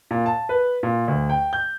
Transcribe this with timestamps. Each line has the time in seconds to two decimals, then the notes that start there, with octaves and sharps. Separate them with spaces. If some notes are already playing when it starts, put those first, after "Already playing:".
0.11 A#2
0.26 A5
0.49 B4
0.83 A#2
1.08 D2
1.29 G5
1.53 G6